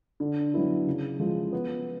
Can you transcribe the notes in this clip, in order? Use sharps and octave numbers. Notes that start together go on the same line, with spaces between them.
D3
F#3 B3 E4
C#3
F3 G#3
B3